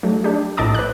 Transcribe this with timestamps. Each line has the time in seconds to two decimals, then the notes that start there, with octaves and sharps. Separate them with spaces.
0.03 F#3 A3
0.24 D4 G4
0.57 A#1 A2 D#5 A5 D6
0.74 B4 F#6